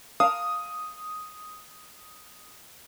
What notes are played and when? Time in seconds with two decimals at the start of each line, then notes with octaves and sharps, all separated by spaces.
0.20 A#4 F5 A5 D#6